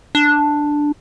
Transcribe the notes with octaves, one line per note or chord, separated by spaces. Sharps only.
D4